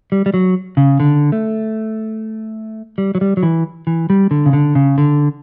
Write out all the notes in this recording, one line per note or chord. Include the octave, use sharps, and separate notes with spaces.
G3
G3
F#3
C#3
D3
A3
G3
F#3
G3
F#3
E3
E3
G3
D3
C#3
D3
C#3
D3